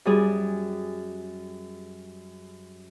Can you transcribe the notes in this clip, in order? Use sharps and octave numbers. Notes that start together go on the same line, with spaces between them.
F#2 G3 G#4